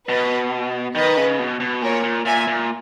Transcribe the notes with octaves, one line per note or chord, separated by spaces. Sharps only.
B2 B4 D#5
D#3 B4 D#5
C#3
B2
B2
A#2 A#4 C#5
A#2
A#2 E5 G#5
A#2